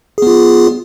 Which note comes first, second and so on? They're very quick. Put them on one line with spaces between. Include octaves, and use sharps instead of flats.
G#4 B3 F4